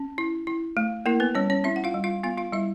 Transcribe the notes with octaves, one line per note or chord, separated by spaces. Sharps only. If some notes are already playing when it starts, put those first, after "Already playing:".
Already playing: C#4
E4
E4
A3
A#3 E4 A#4
B3 B4
G3 C#4 C#5
C#4 C#5
C4 E4 E5
F#5
F4 F5
G3
F4 F5
B3 F4 F5
F4 F5
G3 E4 E5